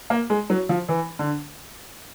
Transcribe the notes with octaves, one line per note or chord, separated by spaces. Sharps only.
A#3
G#3
F#3
F3
E3
D3